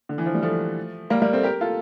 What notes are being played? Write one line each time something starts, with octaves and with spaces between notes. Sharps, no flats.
D3
E3
F3
G3
F3 A3
G3 A#3
G3 A#3
A3 C4
G4 A#4
F4 A4